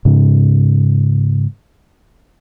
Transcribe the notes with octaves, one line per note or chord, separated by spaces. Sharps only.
G#2 C#3